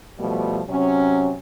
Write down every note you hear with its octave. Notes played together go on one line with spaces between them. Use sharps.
B2 F3 G3 A3
C3 F#3 C#4